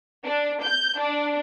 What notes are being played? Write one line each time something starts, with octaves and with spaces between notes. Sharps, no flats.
D4
G6
D4